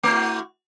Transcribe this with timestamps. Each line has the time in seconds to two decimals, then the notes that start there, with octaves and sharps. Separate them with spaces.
0.03 A3
0.07 E4
0.11 F#4